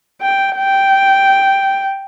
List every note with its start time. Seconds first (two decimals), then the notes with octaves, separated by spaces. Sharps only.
0.21 G5
0.56 G5